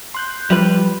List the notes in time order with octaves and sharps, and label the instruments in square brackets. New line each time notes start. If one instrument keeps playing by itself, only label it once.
[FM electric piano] C6 F#6 G6
[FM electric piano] F3 [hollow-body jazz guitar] G3 B4